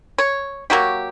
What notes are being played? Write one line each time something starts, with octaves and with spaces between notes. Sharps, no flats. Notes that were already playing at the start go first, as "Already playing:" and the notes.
C#5
F#3 A#3 F#4 G4